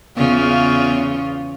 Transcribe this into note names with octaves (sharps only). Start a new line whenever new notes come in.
E2 C#3 F4